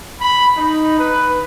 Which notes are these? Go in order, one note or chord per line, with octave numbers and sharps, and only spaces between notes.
B5
D#4
B4